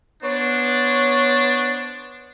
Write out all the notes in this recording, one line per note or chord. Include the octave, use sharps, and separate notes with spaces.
B3 D4 C5 C#5